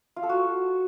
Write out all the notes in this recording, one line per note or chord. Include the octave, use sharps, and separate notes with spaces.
F4
A4
F#4